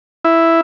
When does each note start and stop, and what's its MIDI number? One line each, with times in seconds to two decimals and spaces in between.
0.25 0.61 64